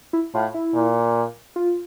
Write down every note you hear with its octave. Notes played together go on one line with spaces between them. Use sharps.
E4
A2 F4
E4
A#2
F4